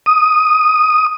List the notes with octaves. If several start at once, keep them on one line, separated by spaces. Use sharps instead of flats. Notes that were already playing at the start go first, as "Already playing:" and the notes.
D#6